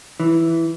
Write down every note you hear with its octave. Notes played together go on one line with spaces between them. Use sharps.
E3